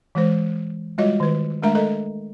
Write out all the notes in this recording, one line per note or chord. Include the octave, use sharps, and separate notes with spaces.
E3 G#3 C5
G3 G#3 F4 F#4 C#5 D#5
D#3 B4
G#3 A3 D4 A#4 E5 A#5
A4 A#4 D#5 A#5